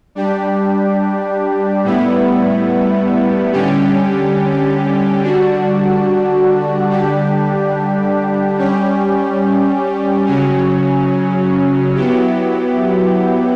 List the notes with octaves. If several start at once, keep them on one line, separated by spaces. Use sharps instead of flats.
G3 D4 G4
A2 G3 B3 E4
D3 G3 C#4 G4
D3 G3 D4 F#4
D3 G3 D4 G4
G3 C#4 G4
C#3 F#3 C#4
F#3 B3 E4 G4